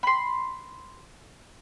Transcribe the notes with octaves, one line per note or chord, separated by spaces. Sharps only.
B5 C6